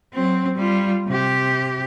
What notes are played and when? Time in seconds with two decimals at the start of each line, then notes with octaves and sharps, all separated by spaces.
0.13 F#3 C4
0.56 G3 F4
1.07 C3 G4